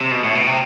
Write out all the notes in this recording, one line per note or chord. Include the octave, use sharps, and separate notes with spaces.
C3
B2
A2
B2
C3